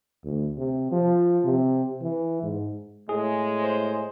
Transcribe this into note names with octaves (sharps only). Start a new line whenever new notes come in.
D2
C3
F3
C3
E3
G#2
A2 G#3 G#4
C5